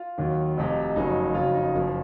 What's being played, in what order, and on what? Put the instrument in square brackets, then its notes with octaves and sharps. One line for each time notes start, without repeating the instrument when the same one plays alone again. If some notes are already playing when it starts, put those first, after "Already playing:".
Already playing: [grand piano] F4
D#2 D#3 F#3
F1 F2 C3 F3
F#1 F2 C#3 F#3 D#4
F2 C#3 F#3 F4
D#4
F#1 F#2 F3